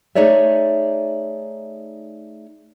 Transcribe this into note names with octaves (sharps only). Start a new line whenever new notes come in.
A3 D#4 G#4 C#5 D5 E5